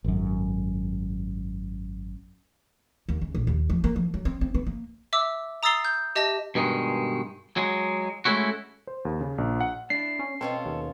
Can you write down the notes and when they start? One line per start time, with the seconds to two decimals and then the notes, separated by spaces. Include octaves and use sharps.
0.04 G#1 F#2
3.09 D#2
3.21 C#3
3.35 A#1
3.47 D#2
3.70 F3
3.84 A#3
3.96 F3
4.14 F#3
4.25 C4
4.41 C4
4.54 B3
4.67 A#3
5.13 E5 D6 E6
5.63 A#5 D#6 E6 A6 C7 G7
5.85 G6
6.16 G4 D#5 E5 A5 A#6
6.55 G2 B2 D#3 G#3
7.57 F#3 G#3
8.25 G#3 A3 C#4 E4 F#4
8.87 C5
9.05 D#2
9.20 C#3
9.38 A#1
9.60 F#5
9.90 D4 E4 C7
10.19 C#4
10.41 B2 C4 C#4 F4 A4
10.66 D#2